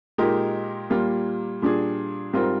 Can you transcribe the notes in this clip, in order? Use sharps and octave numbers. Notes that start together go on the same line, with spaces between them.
A#2 G#3 D#4 G4 A#4
A#2 G3 A#3 F4
A#2 G3 D4 G#4
G#2 G3 C4 F4 A#4